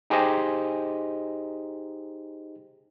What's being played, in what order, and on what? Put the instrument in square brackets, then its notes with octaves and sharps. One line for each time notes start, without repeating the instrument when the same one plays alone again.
[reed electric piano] D#4 G4 G#4 C5 D#5